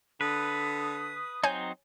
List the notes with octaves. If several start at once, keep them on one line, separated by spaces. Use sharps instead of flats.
D3 B4 D#6
F#3 C4 D#4 C#5 G#5 G6